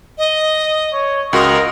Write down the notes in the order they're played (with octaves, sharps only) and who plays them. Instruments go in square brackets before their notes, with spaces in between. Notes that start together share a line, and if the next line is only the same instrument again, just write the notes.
[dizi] D#5
[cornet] C#5
[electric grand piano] C#2 F#4 C6 [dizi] A#4 [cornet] D#5